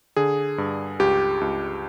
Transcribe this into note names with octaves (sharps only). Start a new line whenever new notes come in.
D3 G#4
G2
C#2 G4
C#2